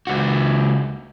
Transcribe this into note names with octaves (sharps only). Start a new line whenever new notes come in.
C#2 F#4